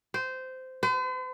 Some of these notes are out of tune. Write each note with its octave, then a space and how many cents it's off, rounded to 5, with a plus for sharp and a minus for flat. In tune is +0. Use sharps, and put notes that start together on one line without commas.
C5 -15
C5 -45